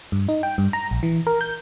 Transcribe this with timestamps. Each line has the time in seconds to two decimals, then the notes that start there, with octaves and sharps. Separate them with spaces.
0.12 G2
0.28 D#4
0.43 G5
0.58 G2
0.73 A#5
0.91 A#1
1.03 E3
1.27 A#4
1.41 G6